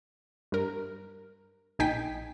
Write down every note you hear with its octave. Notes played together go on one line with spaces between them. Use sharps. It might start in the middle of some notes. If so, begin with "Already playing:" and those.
G2 A#4
A#1 D#4 G5 G#5 B6